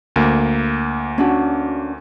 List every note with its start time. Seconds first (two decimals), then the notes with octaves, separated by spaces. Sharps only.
0.16 D2 A#3
1.18 C#4 D4 F#4